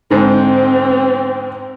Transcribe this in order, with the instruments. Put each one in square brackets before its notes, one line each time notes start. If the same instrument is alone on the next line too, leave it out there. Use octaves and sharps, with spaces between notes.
[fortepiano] G#2 D3 [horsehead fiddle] C4